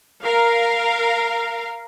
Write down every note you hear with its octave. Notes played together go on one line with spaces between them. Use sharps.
A#4 F5